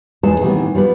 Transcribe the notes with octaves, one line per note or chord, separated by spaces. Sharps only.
E2 G#3 A4 B4 A5
A2 C3 D#3 E3 G3 B3
F3 G3 B3 B4